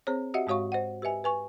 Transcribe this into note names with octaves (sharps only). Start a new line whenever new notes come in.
C4 G#4 C5 C#5
F#4 G4 D#5 E5 F#5
G#2 G#3 F#4 C#5 F5 C#6
C5 D#5 F#5
G4 B4 D#5 E5 G#5
B4 G#5 C#6